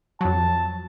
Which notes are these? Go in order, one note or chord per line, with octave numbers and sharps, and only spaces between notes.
F2 F#3 A5